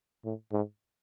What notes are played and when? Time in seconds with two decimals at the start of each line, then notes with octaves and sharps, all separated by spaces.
0.25 A2
0.52 G#2